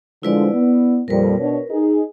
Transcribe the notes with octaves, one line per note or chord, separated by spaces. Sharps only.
D3 F3 G#3 E4 B4 D5
B3
F2 A#2 G3 A#4 B4
B2 D4 C#5
D#4 G#4